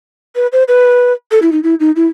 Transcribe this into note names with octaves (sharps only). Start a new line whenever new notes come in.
B4
C5
B4
A4
E4
D#4
E4
D#4
E4